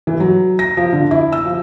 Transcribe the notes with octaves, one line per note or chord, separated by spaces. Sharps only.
E3
F#3
A#6
F3
D3
E4
E6
F3